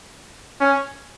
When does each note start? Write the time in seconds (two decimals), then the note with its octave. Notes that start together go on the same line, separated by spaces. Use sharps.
0.61 C#4